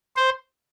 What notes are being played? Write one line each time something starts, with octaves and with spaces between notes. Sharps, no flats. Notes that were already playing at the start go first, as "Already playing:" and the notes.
C5